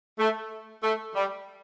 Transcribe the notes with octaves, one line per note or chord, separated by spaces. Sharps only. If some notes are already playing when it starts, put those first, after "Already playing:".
A3
A3
G3